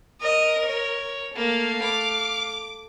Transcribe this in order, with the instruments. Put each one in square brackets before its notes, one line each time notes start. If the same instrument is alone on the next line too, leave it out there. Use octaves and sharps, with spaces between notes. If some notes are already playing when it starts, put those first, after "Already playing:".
[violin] A#4 [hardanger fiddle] D#5
[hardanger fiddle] C#5
[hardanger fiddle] A3 F5 [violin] A#3
[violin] D6